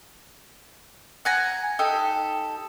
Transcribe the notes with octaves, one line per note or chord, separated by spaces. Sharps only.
F#5 G#5 A#5
D#4 G4 A4